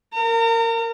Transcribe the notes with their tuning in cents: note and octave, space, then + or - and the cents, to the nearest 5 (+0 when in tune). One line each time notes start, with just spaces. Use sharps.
A#4 -15 A#5 -40